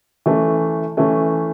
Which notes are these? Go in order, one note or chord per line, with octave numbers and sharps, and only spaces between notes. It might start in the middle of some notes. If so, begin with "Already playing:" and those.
E3 A3 C#4
E3 A3 C#4